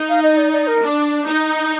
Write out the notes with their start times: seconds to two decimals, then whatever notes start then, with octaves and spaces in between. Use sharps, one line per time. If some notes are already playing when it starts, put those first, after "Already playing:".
Already playing: D#4
0.09 F5
0.23 D#5
0.38 D5
0.53 D5
0.67 A#4
0.82 D4
1.26 D#4